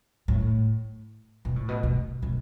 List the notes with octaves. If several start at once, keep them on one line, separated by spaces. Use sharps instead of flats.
A2
B2
A2
B2
B2
B2